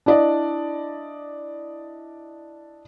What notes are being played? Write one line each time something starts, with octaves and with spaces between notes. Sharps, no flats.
D4 E4 D5 D#5